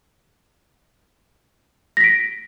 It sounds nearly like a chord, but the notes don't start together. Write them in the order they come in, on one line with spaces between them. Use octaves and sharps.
A#6 B6 D7